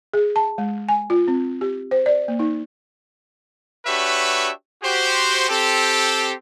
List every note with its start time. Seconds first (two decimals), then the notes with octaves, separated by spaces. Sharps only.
0.13 G#4
0.36 A5
0.58 G#3
0.89 G#5
1.10 F4
1.28 C4
1.61 G4
1.91 C5
2.06 D5
2.28 A#3
2.39 D#4
3.86 D4 F#4 G4 B4 C#5 E5
4.84 F#4 G4 C5
5.49 C4 G4 A4